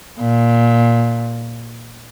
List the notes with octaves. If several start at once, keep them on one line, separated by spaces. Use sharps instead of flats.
A#2